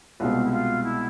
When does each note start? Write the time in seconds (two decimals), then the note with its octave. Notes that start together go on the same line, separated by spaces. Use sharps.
0.20 C2 B2 G#3 B3 F4
0.45 E4
0.52 F4
0.83 E4